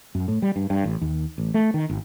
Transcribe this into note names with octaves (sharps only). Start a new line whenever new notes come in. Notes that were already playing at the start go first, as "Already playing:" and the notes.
F#2
A2
G3
G2
G2
A1
D#2
A1
A3
D#3
G#1